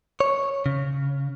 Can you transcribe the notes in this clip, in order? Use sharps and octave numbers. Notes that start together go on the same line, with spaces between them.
C#5
C#3